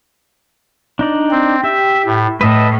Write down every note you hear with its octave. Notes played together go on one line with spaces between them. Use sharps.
D4 D#4 D5
C4
G4 E5
A2
A2 B4 D#5 E5 A5